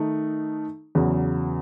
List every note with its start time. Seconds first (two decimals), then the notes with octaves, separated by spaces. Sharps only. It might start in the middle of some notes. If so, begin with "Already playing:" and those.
Already playing: D#3 A3 D#4
0.95 E2 C#3 F#3